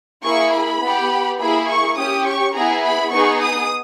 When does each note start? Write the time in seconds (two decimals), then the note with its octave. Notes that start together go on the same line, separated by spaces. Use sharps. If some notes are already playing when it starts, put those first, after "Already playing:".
0.23 A#3 E4 G#4 C#6
0.52 B5
0.80 B3 G4
1.38 A#3 E4 G#4 B5
1.68 C#6
1.97 C#4 G4 D#6
2.25 C#6
2.54 B3 E4 G#4 A#5
2.83 B5
3.12 B3 D#4 G#4 C#6
3.42 D#6